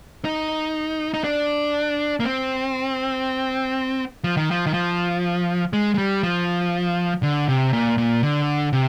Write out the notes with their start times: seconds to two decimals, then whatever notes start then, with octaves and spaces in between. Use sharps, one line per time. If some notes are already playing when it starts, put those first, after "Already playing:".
0.25 D#4
1.14 D#4
1.24 D4
2.20 A#3
2.24 C4
4.24 F3
4.37 D#3
4.51 F3
4.66 D#3
4.74 F3
5.73 G#3
5.94 G#3
5.98 G3
6.23 F3
7.23 D3
7.48 C3
7.73 A#2
7.98 A#2
8.23 D3
8.73 C3